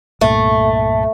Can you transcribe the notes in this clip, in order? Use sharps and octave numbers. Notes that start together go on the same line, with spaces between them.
C2 G2 A#2 A3